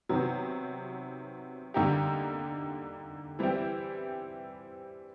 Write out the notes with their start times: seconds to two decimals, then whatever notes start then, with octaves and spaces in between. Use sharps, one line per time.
0.09 C3 D#3 F#3 B3
1.74 D3 G3 A#3 D#4 G4
3.39 E3 G3 C4 E4 G4